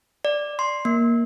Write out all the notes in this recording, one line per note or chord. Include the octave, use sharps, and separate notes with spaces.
D5
C6
A#3